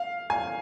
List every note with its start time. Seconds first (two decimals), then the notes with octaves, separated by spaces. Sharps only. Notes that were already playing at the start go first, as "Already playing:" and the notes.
Already playing: F5
0.30 G#5